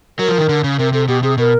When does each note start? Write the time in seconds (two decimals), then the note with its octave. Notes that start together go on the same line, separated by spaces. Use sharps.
0.19 F#3 A#4
0.29 F3
0.38 D#3
0.49 D3
0.64 C#3
0.78 C3 A#4
0.93 C3 A4
1.08 B2 G4
1.23 C3 G#4
1.38 B2 A#4